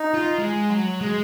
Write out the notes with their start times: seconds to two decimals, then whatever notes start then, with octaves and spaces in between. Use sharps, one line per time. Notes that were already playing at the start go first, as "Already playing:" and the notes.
Already playing: D#4
0.15 F4
0.38 G#3
0.70 F#3
1.01 G#3